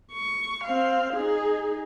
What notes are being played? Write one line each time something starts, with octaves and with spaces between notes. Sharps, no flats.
C#6
C4 F5
D#4 G#4